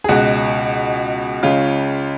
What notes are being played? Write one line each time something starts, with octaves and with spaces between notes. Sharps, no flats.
G#4
C#2 B2 G#3 F#4
C#2 C#3 G#3 F4